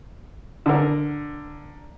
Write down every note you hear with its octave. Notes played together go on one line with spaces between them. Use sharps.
D3 A#4